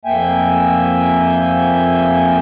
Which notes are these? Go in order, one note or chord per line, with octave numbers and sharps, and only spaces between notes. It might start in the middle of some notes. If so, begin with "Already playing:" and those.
F2 A#3 E5 G5 G#5